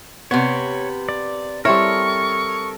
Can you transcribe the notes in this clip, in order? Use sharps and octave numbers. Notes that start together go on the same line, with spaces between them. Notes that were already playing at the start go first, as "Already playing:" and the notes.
C3 B3 C#5
D5
G3 C4 E4 A4 A#4 C#5 C#6